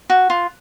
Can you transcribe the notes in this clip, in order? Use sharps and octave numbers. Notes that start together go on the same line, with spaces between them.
F#4
F4